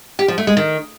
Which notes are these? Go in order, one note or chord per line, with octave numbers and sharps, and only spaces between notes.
G4
F3
A3
G#3
D#3